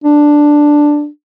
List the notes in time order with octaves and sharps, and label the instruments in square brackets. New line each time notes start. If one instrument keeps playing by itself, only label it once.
[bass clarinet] D4